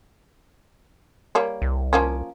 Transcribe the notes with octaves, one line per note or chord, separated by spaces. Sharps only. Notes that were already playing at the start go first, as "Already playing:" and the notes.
G3 A#3 C#5
C2
F3 A#3 C#4